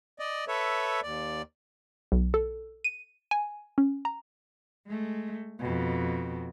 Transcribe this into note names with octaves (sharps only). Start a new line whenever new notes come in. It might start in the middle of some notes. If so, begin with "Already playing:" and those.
D5 D#5
A4 B4 C#5 E5
D#2 D5
B1
A4
D#7
G#5
C#4
A#5
G#3 A3
F2 B2